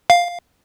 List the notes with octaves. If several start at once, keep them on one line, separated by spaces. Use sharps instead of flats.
F5